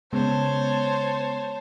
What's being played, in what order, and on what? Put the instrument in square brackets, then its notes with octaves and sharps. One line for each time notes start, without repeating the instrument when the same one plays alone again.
[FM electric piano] C#3 G#3 B3 [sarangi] C5 [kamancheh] C#5 A5